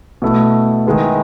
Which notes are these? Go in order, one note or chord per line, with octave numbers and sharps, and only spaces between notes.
B2 A3 E4
D#3 G#3 B3 E4